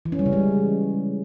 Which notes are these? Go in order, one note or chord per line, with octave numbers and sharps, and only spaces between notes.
E3
C#4
G3
C#3
G#3